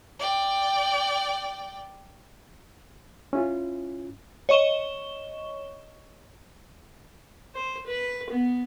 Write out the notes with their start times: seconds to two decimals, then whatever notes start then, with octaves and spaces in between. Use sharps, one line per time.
0.19 D5 G5
3.33 C#4 E4 F4
4.49 C#5 D#5 C#6 E7 G7
7.55 C5
7.87 B4
8.30 B3